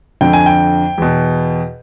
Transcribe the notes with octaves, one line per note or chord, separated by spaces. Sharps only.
F2 D3 G5
G#5
G5
E2 B2